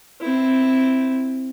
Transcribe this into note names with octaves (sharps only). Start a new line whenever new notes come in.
C4 E4